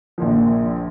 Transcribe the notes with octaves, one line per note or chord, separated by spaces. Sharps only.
A#1 A#2 F3